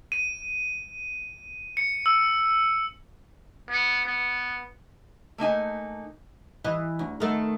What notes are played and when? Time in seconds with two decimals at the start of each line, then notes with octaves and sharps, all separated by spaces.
0.12 D#7
1.77 C#7
2.06 E6
3.69 B3
4.05 B3
5.38 A3 A#3 D#4 G#5
6.64 E3 D#5
6.99 D2
7.20 D#3 A3 B3